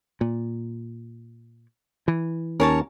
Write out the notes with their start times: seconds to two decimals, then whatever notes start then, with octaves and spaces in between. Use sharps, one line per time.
0.21 A#2
2.08 E3
2.60 D#2 C#4 A#4 C#5 A5